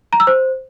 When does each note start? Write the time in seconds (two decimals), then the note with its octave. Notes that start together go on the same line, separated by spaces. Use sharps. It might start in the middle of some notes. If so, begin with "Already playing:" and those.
0.13 A#5
0.20 E6
0.27 C5